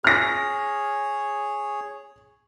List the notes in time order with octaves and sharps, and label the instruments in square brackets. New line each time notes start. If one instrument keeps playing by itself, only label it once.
[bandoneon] G#4 C#5 [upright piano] F6 A#6